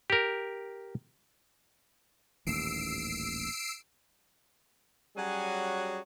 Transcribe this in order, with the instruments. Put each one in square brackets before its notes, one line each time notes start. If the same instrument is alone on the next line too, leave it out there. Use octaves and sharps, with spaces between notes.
[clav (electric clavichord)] G4 A#4
[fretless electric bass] D#1 A1 D#2 [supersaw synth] E6 C7 D7
[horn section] F#3 G3 C#4 F#4 G#4